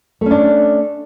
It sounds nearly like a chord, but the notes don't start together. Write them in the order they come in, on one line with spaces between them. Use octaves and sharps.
A3 C#4 D4